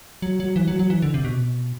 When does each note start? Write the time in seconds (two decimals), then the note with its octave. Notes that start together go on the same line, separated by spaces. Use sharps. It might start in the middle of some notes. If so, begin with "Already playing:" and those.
0.22 F#3
0.40 F#3
0.56 E3
0.68 F#3
0.79 F#3
0.90 E3
1.02 D3
1.14 C3
1.25 B2